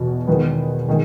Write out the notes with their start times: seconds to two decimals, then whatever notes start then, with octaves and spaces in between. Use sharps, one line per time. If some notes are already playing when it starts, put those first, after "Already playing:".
Already playing: E2 B2
0.27 E2 D#3 G#3 B3
0.88 D#3 G#3